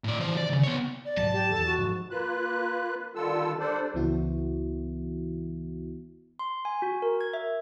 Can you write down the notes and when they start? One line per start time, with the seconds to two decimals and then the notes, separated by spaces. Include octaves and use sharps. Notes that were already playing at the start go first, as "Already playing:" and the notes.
0.04 A2 D5
0.19 E3 C5
0.37 D5
0.50 D2 C#3
0.63 B3 C#5
1.05 D5
1.17 G#2 B2 F#3 A5
1.33 G4
1.51 E2 E3 A4
1.65 F#4
1.79 G#2 F3
2.11 A#3 F4 B4 F#6
3.15 D3 D#3 G3 F4 A4 E6
3.60 G3 D4 A4 C5 D5
3.94 C#2 E3 B3 E4 F#4
6.39 C6
6.65 G#5
6.82 F#4
7.02 A#4
7.21 G#6
7.33 E5